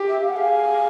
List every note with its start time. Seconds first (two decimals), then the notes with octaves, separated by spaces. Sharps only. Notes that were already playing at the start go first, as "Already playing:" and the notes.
Already playing: G4
0.09 E5
0.22 F5
0.29 F#5
0.36 G#4 F5